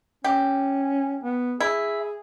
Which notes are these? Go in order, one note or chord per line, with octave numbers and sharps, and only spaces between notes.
C#4 G4
B3
E4 G#4